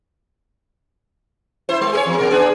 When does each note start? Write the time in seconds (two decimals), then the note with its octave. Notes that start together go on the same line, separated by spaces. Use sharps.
1.69 E4 C5
1.81 G#3
1.92 G#4 A#4 C#5
2.06 E2
2.18 B2 A#4
2.30 B3 D4 G#4